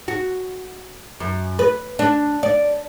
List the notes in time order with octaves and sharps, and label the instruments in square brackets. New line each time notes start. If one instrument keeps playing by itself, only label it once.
[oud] F#4
F#2
B4
D4
D5